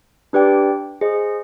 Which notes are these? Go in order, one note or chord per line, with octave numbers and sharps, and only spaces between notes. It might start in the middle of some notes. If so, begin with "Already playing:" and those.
D4 G4 B4 D5 G5
G#4 C5 D#5